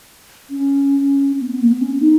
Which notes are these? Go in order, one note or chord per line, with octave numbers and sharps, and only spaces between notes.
C#4
B3
B3
A#3
B3
C#4
B3
D#4